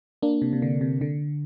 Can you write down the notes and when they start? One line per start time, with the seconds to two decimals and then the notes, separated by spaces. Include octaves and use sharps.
0.22 A#3 D4
0.42 C3
0.53 C3
0.62 D3
0.81 C3
1.01 D3